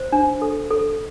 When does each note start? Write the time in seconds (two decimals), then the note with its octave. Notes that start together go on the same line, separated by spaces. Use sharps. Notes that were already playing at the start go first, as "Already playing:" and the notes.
Already playing: C5
0.12 D4
0.42 A4
0.71 A4